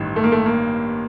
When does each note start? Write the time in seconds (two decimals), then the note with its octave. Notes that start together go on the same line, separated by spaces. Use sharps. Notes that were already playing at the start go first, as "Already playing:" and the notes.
Already playing: A1 G2 D#3
0.16 A3
0.23 A#3
0.32 A3
0.46 A#3